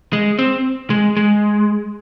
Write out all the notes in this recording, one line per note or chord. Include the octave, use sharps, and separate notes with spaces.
G#3
C4
G#3
G#3